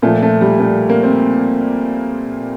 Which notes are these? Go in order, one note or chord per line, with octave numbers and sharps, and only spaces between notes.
A#2 F3 A3
A3
G3
A3
A#3
C4